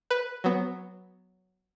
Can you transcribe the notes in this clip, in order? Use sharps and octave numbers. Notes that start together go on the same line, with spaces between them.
B4
F#3 B3